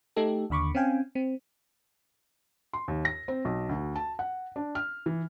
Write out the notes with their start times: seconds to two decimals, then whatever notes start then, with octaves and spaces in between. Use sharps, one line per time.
0.16 A3 D#4 G4 A4
0.50 D#2 D3 B5 C#6 D6
0.75 C4 C#4 F5 G5 G#5
1.15 C4
2.73 C6
2.88 D#2
3.05 A#6
3.28 C4
3.45 B1
3.69 D2
3.96 A5
4.19 F#5
4.56 D4
4.75 F6
5.06 E3